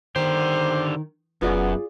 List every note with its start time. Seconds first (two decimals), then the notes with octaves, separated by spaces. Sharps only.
0.16 D3 D#3 G4 C5
1.42 F1 F#2 B3 F4 G#4 D5